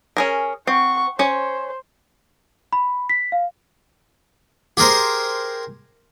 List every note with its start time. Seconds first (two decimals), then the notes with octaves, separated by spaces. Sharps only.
0.17 C#4 G#4 A#4
0.67 C4 F#5 C#6
1.19 C#4 C5 C#5
2.73 B5
3.09 B6
3.32 F5
4.77 G4 G#4 A#4 C5